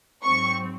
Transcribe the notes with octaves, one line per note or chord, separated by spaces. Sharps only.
G#2 F#3 C4 C#6